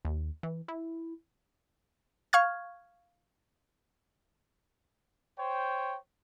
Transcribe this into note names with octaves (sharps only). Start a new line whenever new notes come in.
D#2
E3
E4
F5 C#6 F6 G#6
C5 C#5 G5